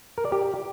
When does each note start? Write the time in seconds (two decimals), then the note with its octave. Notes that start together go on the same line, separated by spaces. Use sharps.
0.18 A#4
0.25 D5
0.32 G4